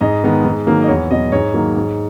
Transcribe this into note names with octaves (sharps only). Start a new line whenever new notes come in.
G#2 D#5
D#3 G#3 B3
G#2
D#3 F#3 A#3
D#5
E2 C#5
B2 F#3 D#5
G#2 C#5
D#3 F#3 A#3
G#2